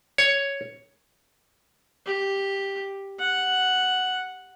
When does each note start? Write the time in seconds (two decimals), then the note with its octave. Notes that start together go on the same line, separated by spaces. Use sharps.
0.18 C#5
2.06 G4
3.19 F#5